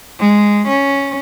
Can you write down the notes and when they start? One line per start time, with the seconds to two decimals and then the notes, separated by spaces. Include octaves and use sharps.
0.19 G#3
0.67 C#4